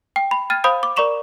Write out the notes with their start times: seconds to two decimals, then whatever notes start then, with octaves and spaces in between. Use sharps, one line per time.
0.16 G5
0.31 B5
0.50 G5 F6 G#6 A6 D#7
0.64 C5 F5 B5 D#6 G6 D7
0.83 D6
0.96 A#4 D5 A#5 C#6 E7 F7